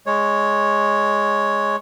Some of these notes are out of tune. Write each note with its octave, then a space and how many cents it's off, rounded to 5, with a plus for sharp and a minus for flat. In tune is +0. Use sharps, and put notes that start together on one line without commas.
G#3 +0 C#5 +0